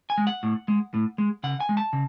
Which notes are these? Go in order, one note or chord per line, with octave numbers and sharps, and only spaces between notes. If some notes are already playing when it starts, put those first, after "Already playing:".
G#5
G#3
F#5
A2
G#3
A2
G#3
C#3 F#5
G#5
G#3
A5
C#3